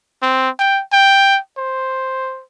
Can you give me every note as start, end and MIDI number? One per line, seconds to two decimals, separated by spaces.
0.22 0.50 60
0.59 0.82 79
0.93 1.39 79
1.58 2.43 72